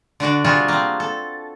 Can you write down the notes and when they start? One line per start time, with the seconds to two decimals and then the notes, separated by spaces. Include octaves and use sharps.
0.20 D3 D4 F#4 D5
0.45 C3 G3 F4 F#4 G#4
0.68 A#3 C4
1.00 A4